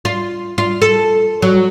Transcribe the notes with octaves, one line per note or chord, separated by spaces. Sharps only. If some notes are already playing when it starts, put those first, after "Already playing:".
F4
F4
A4
F#3